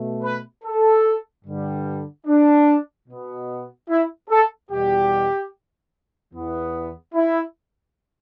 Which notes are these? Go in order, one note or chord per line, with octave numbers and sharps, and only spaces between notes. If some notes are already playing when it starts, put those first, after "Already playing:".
Already playing: B2 A3
B4
A4
G2 D3 G3
D4
B2 B3
E4
A4
E2 B2 G3 G4
E2 E3 B3
E4